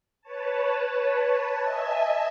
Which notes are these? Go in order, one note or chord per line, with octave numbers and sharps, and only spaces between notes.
B4 C#5 A5
D#5 E5 G#5 A5